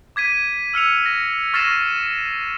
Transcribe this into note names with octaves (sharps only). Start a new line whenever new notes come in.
D6 G#6 B6 D#7
E6 F6 C#7 F7
A#6
C#6 F6 A6 A#6 C7 E7